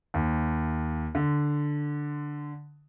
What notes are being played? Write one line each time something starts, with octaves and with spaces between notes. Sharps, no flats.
D#2
D3